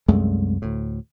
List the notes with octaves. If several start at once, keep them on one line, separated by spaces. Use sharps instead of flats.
C2 F#2 G#3 A3
D2 A2